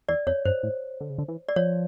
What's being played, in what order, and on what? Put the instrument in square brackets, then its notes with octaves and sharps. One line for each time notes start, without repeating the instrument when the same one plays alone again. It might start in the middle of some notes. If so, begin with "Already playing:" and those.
[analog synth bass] E2 [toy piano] D5
[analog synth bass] F2 [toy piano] C#5
[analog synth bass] G2 [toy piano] C5
[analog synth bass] A2
D3
C#3
D3
E3
[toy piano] D5
[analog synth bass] F3 [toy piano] C#5